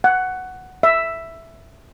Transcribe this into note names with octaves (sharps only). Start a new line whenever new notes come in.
F#5
E5